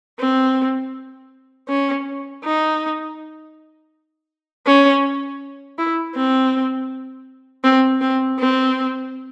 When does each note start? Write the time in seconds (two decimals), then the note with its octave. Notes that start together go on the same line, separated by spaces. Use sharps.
0.19 C4
1.69 C#4
2.44 D#4
4.67 C#4
5.78 E4
6.16 C4
7.64 C4
8.01 C4
8.40 C4